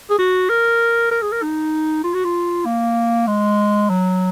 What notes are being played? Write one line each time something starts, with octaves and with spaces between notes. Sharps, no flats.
G#4
F#4
A#4
A#4
G#4
A#4
D#4
F4
F#4
F4
A#3
G#3
F#3